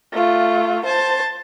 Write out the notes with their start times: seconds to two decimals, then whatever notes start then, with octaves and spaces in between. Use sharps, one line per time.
0.13 A3 F4
0.85 C5 A5